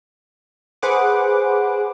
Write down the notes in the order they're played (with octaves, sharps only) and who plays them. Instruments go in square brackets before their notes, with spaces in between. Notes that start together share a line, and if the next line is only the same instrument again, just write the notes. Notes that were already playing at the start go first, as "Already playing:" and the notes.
[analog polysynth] G#4 B4 C5 F#5 D6